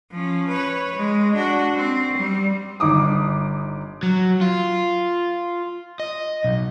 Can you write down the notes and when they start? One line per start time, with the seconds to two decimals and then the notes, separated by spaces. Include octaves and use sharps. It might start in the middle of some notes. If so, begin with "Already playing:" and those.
0.11 F3 C#4
0.49 B4 C#5
0.96 G#3
1.35 D4 F#4
1.76 C4
2.18 G3
2.80 G1 D#4 D6 D#6
4.03 F#3
4.41 F4
6.00 D#5
6.44 B1